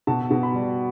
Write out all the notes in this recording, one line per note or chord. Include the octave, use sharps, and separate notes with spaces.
B2 A5
B2
B5
G3